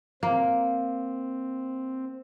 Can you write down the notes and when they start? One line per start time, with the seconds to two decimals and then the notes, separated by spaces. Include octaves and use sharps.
0.23 A#3 C4